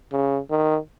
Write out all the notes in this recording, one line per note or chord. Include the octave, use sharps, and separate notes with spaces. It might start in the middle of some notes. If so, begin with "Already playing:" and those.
C#3
D#3